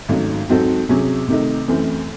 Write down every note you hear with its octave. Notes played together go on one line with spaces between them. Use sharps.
G#1 G#2 F#3 A3 C#4
G#2 F#3 C4 F#4 A4
C3 F#3 C#4 G#4
C3 D#3 A3 D#4
F#2 E3 A3 C4